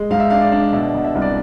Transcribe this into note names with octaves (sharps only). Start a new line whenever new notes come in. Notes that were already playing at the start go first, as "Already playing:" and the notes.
Already playing: G#3
G#2 F5
E5
D4 F5
D5
D4
B2 E5
B2
E5
C2
D5